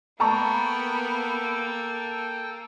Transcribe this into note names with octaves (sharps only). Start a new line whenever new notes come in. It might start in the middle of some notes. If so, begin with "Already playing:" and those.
A#3 B3 A4 G5 A5 A#5 C#6